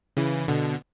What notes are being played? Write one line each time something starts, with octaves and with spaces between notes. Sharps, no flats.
C#3 E3
B2 D3